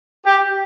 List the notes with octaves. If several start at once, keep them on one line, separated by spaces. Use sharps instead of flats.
G4